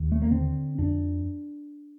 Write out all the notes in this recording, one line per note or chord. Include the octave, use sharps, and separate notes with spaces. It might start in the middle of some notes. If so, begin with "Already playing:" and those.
Already playing: D#2
A3
A#3
D3 C4
F2 D4